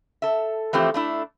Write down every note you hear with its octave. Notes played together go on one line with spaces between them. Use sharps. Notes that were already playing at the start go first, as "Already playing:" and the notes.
A4 E5
E3 F3 A3 C4 G4
A3 D4 E4